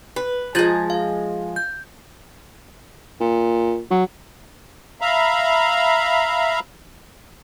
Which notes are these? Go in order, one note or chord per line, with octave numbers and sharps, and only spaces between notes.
B4
F3 G#3 F4 G#6 A6
F5
G6
A#2
F#3
E5 F5 A#5 B5